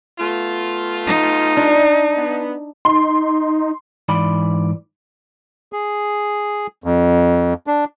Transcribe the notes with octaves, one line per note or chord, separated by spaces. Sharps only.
A3 B3 F4
D#4
D4
B3
D#4 C6
G#2 E3 D5 B5
G#4
F2
D4